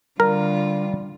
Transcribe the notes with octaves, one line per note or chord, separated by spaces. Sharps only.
D3 G3 F4 A#4